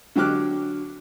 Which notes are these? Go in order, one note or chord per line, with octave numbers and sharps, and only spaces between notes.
D3 F#3 G4 D6 F6 F#6